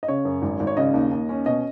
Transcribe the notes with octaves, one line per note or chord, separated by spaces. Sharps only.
D#5
C#3 C#5
F#2
G#1
G#1
C#5
C#3 D#5
D#2
D#2
C#4
B2 D#5